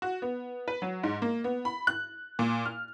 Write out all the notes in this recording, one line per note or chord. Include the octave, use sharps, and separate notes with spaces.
F#4
B3
B4
F#3
G#2
A#3
B3
B5
F#6
A#2
F6